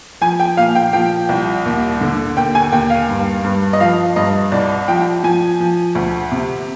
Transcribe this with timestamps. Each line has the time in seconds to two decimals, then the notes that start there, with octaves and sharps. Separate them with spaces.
0.21 F3 G#5
0.40 G5
0.57 A#2 F5
0.75 G5
0.93 F3 G5
1.29 C2
1.65 D#2
2.01 D3
2.37 D#2 G5
2.55 G#5
2.72 D#2 G5
2.90 F5
3.09 G2
3.44 G2
3.73 D#5
3.80 F3 F5
4.16 G2 D#5
4.52 C2 D5
4.88 F3 G5
5.23 F3 G#5
5.60 F3
5.95 D2
6.31 C3